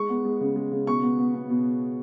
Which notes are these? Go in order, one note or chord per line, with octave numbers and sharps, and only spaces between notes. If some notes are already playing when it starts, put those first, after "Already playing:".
Already playing: G#3 C#6
B3
G#3
C#3
G#3
C#3
B2 C#6
B3
B3
B3
B2